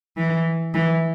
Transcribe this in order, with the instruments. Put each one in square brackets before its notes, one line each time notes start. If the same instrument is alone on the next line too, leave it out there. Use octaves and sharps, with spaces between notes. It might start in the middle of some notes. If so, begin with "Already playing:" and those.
[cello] E3
E3